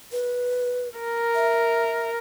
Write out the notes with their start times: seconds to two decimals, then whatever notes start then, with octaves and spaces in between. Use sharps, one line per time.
0.12 B4
0.99 A#4
1.35 E5